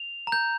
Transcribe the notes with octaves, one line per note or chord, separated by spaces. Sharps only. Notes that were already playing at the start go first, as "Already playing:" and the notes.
Already playing: F7
A#5
G6